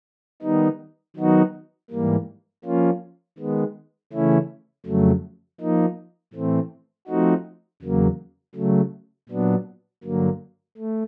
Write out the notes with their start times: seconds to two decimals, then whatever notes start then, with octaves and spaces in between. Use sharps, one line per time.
0.42 D#3 G3 B3 D#4
1.16 D#3 F#3 B3 D#4 F#4
1.90 G#2 E3 G3 A#3
2.65 F3 A#3 C#4 F4
3.38 D#3 G#3 B3
4.13 C#3 E3 A3 C#4 E4
4.86 F2 C#3 F#3 A3
5.60 F3 A#3 D#4
6.33 A2 E3 A3 C4
7.07 F3 A3 C4 D#4 F#4
7.82 E2 C#3 F#3 A#3
8.55 C#3 F#3 A3
9.29 A#2 F#3 B3 D4
10.04 G2 D3 F#3 A#3
10.77 A3